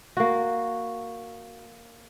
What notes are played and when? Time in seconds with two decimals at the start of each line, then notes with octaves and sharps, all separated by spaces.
0.17 A#3 F#4